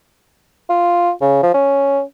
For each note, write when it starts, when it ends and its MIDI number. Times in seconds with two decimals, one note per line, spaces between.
0.69 1.11 65
1.21 1.43 49
1.43 1.51 53
1.54 2.01 61